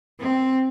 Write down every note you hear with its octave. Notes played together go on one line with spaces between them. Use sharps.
C4